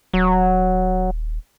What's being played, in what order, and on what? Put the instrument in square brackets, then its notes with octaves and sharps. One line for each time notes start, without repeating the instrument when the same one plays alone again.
[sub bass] D#1 [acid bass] F#3